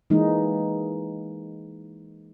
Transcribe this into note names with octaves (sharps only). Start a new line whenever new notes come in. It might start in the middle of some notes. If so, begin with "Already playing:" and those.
E3 G#3 A#3 D#4